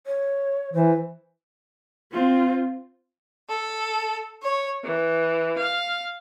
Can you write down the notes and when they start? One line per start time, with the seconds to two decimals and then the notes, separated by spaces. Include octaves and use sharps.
0.06 C#5
0.73 E3 C5
2.12 C4 F4
3.49 A4
4.42 C#5
4.83 E3
5.56 F5